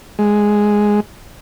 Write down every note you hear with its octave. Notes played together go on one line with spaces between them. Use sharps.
G#3